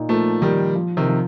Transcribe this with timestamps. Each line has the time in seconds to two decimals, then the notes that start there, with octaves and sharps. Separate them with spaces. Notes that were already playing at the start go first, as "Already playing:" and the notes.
Already playing: A#2 D#4
0.09 F3 A3 A#3
0.42 D#3 F3 G3
0.75 F3
0.97 C3 D#3
1.08 F3